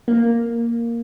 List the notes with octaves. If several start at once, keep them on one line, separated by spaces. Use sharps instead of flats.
A#3